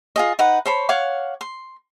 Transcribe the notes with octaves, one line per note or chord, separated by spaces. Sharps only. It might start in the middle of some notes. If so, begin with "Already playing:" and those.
F4 G#4 D#5
D#4 B4 F#5
C5 C#5 A5 B5
C#5 F5 F#5 D6
C6